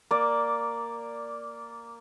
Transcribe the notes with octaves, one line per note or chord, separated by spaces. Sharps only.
A#3 D5